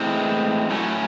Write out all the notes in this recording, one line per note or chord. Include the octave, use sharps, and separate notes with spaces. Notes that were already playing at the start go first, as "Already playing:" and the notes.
Already playing: A2 E3 G#3 C4
A2 F#3 A3 C#4